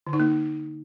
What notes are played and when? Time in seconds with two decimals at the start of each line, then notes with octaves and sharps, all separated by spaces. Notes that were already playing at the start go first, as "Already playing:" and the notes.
0.07 D3
0.13 D#4
0.20 A#3